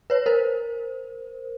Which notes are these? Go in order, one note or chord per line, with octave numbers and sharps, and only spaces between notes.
B4 C#5
A#4 C5